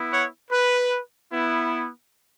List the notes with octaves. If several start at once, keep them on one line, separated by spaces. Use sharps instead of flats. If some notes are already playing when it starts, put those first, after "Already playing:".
Already playing: B3 E4
C#5 F#5
B4
B3 E4